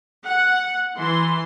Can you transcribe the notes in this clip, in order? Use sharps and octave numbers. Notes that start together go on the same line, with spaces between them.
F#5
E3 C6